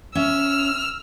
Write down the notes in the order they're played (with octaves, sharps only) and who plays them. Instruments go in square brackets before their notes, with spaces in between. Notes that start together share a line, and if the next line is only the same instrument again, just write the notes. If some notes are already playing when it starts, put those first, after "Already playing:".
[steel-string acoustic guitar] C#4 E5 [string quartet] E6 F6